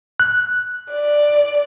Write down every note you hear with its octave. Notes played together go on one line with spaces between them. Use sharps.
F#6
D5